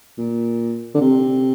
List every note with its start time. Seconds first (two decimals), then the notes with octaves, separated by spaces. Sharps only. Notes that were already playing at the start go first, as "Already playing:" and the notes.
0.18 A#2
0.94 D3
1.00 C3